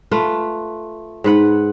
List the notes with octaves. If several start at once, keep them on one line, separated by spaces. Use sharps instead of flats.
A3 F4 B4
G#2 B4 F#5